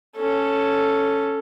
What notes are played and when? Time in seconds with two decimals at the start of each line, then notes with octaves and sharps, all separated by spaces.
0.16 C#4 A4